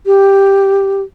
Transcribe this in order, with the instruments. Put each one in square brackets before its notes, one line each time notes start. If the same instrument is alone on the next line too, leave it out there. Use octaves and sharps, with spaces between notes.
[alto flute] G4